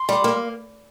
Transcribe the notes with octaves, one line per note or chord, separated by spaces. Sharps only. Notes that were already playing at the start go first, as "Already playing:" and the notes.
Already playing: C6
G3
A#3